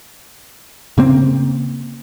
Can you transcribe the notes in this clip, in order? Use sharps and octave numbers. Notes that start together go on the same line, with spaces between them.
C#3 A#3 C4